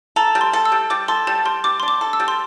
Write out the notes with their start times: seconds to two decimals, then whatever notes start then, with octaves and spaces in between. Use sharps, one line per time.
0.16 A4 A#5
0.35 G3
0.41 C6
0.53 A4
0.65 E6
0.72 G3
0.90 G3 D6
1.08 A4 C6
1.27 G3 A5
1.45 G3 C6
1.64 G3 D6
1.80 D4 C6
1.88 D6
2.01 A4
2.13 E6
2.20 G3
2.28 C6